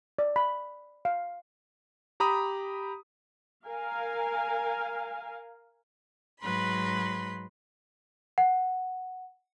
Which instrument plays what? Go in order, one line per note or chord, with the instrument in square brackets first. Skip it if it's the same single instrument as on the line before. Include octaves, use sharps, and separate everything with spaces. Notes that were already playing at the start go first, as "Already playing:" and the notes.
[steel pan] D5
B5
F5
[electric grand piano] G4 A#5 B5 D#6
[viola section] A#4 F5 G#5
[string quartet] G#2 F#3 B4 B5 C6
[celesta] F#5